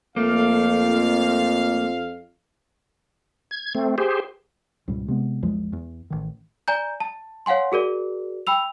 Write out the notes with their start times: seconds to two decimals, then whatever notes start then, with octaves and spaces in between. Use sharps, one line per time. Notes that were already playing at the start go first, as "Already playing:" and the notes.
0.16 F2 A3 A#3 F5
3.51 G#6
3.75 A3 C4
3.98 G4 G#4 C5
4.88 C#2 G#2 B2 G3
5.08 C3 G#3 B3
5.42 A#1 E2 F3 G#3
5.73 E2
6.10 A1 D#3
6.68 D5 G#5 A#5 G6
7.00 A5
7.46 C#5 F5 F#5 G#5 C6
7.72 F#4 G#4 A#4 D5
8.47 G5 B5 E6 F7